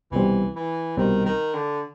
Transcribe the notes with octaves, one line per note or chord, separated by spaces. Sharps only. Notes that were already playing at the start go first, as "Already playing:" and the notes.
C2 B2 E3 G3 C4
E3
C2 B2 D#3 G3 C4
D#3
D3